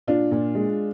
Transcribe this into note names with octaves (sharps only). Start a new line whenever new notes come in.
A#2 D4 F4
A#2
G#3